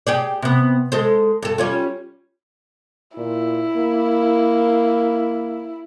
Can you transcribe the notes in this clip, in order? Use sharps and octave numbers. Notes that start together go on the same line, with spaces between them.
G4 G#4 D5
C3 B3
G#3 A4 C5
G2 A4
G3 C#4 F4
A#2 E4
A#3